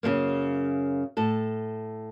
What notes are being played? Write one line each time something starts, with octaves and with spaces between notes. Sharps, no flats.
F#2 C#3 F3 G#3 A#3
A2 A4